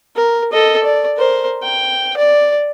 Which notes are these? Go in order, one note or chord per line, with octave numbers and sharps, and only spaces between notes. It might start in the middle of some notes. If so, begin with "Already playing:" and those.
A#4
A4 D#5
D5
A#4 C5
G5
D5